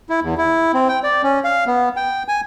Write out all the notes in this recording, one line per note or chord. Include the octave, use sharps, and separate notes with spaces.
E4
E2
E4
C4
G5
D5
C#4
F5
B3
G5
G#5